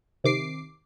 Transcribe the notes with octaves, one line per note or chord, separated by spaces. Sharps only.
C3 D#3 D6 C7